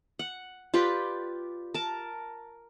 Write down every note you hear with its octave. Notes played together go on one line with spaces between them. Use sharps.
F#5
F4 G4 B4 D5
A#4 A5